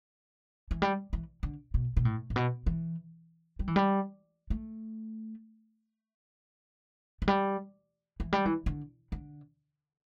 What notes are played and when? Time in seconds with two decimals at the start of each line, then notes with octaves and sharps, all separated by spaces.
0.71 E3
0.82 G3
1.13 E3
1.43 D3
1.74 B2
1.97 B2
2.05 A2
2.30 A2
2.36 B2
2.66 E3
3.59 G3
3.68 E3
3.76 G3
4.50 A3
7.22 E3
7.28 G3
8.20 E3
8.33 G3
8.46 E3
8.66 D3
9.12 D3